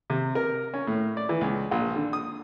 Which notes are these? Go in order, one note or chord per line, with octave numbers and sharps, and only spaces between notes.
C3
A#4
C#4
A2
D5
E3
C#2
A#1
D3
D#6